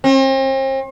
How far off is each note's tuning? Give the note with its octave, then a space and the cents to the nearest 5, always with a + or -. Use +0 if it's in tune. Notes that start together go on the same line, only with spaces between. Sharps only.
C4 +40